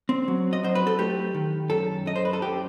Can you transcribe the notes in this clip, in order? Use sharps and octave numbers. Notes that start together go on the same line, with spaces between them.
C4
F#3
D#5
F#3 C5
B4
A4
A3 G4
D#3
F#2 A4
F#2 D#5
C5
B4
A4
F#2 G4